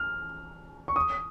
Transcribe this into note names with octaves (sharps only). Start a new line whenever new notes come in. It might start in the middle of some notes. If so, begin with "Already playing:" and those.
Already playing: F6
C#6
D#6